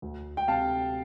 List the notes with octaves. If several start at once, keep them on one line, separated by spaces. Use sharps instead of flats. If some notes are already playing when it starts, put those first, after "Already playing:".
D2
G5
C3 F5 A5